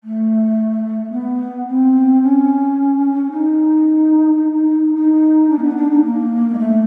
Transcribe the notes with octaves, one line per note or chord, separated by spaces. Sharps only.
A3
B3
C4
C#4
D#4
D#4
D4
A#3
B3
D4
D#4
A#3
G#3
A3